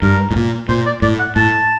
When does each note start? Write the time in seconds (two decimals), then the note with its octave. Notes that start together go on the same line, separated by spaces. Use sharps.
0.02 G2 A#4
0.31 A2
0.36 A#2
0.69 A#2 C5
0.86 D5
1.02 A2 D5
1.19 F#5
1.36 A2 A5